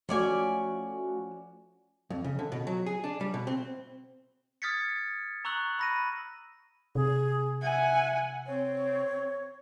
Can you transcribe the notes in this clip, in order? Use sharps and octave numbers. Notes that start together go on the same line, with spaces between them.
F3 A3 C#4 F#4 D5 G#5
F2
C#3
D3
B2
F#3
G#4
D4
G3
B2
C4
D#6 F6 G#6 A6 B6 C#7
A#5 C#6 E6 F#6 F#7
B5 A#6 D#7
C3 G#4
E5 F#5 G#5
C4 C#5